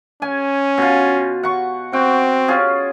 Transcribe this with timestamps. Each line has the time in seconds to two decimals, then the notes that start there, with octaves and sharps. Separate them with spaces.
0.22 C#4 G#5
0.78 B2 F4
1.43 F#5 C#6
1.93 C4 F#4 G5
2.48 C#4 F4 G#4